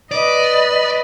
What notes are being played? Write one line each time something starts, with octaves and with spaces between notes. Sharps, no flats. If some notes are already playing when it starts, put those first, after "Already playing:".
B4 D5 D#5